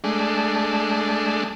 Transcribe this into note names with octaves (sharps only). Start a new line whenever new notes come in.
G#3 A3 D4